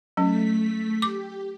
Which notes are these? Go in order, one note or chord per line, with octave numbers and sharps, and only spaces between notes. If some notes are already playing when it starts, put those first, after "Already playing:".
F#3 A3 C#4 B6
G4 D6